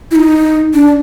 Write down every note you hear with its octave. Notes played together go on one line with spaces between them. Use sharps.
E4
D#4
D4